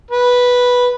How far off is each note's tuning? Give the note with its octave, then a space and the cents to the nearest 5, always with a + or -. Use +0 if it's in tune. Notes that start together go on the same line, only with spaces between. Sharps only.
B4 -5